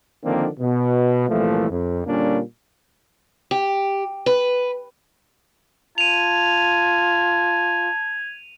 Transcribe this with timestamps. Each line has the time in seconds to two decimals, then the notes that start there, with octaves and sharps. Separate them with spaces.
0.25 D3 D#3 F3 A#3 C4 D4
0.60 B2
1.29 C2 A#2 E3 F3 A3
1.70 F2
2.06 A#2 D3 G3 A#3 C#4 D4
3.51 G4
4.26 B4
5.98 F4 A5 G#6 D#7 F7